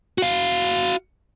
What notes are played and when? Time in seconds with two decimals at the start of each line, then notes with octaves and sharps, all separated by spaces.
0.18 F#4 F5